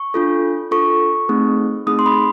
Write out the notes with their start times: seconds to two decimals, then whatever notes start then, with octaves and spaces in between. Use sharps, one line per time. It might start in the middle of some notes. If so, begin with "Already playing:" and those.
Already playing: C#6
0.14 D4 F4 A4
0.71 D4 F4 A4 C#6
1.29 A3 C4 D#4 G#4
1.87 A3 C4 D#4 G#4 D#6
1.99 C6
2.06 B5